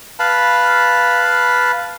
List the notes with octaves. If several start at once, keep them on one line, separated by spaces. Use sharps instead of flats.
B4 F5 A5 B5